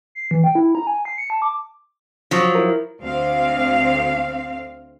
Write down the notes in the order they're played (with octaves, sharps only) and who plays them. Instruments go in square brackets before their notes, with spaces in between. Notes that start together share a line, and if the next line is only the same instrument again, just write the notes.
[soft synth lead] C7
E3
G5
E4
A#5
G#5
C7
C#7
A5
D6
[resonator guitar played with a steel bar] F3 F#3
[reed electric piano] E4 A#4
[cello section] D2 C4 F5